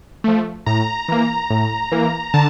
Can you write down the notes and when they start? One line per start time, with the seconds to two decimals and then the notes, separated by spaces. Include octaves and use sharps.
0.24 F3 A3
0.66 A2 A#5
1.08 E3 A#3
1.50 A2
1.92 E3 A#3
2.34 D3 A5